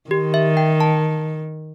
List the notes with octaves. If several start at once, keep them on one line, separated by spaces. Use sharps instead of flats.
D#3 G4
E5
G5
A5